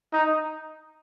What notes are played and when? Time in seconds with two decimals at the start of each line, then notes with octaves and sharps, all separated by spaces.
0.13 D#4